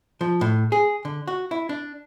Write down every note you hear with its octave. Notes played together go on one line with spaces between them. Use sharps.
F3
A2
G#4
D3
F#4
E4
D4